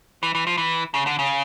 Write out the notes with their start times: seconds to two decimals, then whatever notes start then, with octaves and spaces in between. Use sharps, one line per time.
0.23 E3
0.35 E3
0.47 F3
0.58 E3
0.94 C#3
1.07 D3
1.19 C#3